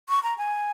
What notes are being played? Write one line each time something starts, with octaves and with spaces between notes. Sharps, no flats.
C#6
A#5
G#5